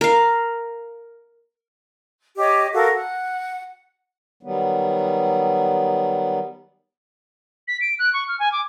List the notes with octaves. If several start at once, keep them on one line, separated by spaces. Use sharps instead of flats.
A#4 F5
G4 C#5 D#5
F#4 A4 A#4 F5
F#5
D#3 F#3 G3 B3
B6
D7
F#6
C#6
F6
G#5
D6